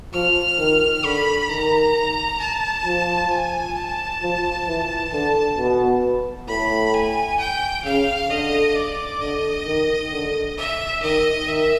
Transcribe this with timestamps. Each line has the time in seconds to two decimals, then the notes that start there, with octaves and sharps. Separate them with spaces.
0.13 F3 F6
0.59 D#3
1.04 D3 B5
1.50 D#3 A#5
2.40 A5
2.85 F3
3.31 G#5
3.76 A5
4.22 F3
4.68 E3
5.13 D3 A5
5.57 B2
6.48 A2 B5
6.94 G#5
7.40 G5
7.85 C#3 F5
8.30 D3 D#5
8.76 D5
9.20 D3 D#5
9.66 D#3
10.12 D3
10.58 E5
11.02 D#3 D#5
11.48 D#3 E5